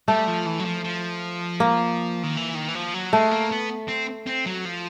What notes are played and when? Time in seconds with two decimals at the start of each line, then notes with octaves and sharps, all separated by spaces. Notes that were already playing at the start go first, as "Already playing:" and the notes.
0.08 G3 A3
0.27 F3
0.46 E3
0.59 F#3
0.65 F3
0.84 F3
1.60 A#3
2.23 D#3
2.37 E3
2.55 D#3
2.68 E3
2.75 F3
2.94 F#3
3.13 G#3 A3
3.31 A#3
3.51 B3
3.88 C4
4.27 C4
4.46 F#3
4.65 F3